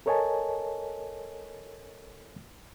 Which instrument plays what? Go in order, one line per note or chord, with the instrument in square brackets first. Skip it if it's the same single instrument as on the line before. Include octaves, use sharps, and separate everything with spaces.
[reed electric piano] A4 A#4 C#5 D#5 G#5 A5